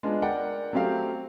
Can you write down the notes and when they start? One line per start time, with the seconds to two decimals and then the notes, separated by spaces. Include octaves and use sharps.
0.03 G#3 B3 D4 F4 G#4
0.22 A#4 D5 F#5 G5
0.73 F#3 A3 C4 G4 F5